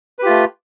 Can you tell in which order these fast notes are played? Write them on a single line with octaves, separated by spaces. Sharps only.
B4 G4 F4 A3